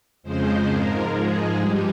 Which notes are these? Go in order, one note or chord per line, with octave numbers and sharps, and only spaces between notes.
F2 C#3 F3 G#3 C5
G#2 F3 G#3 A#4
G#2 F3 G#3 G#4
G2 G3 G4